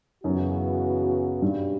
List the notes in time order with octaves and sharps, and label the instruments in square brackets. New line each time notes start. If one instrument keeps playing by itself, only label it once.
[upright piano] F#2 [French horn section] C#3 E3 B3 F#4
[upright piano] G2 [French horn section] B2 G3 C#4 F#4